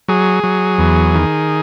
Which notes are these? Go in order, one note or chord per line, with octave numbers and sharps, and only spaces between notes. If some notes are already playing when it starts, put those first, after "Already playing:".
F#3 G#4
F#3
E2
D#3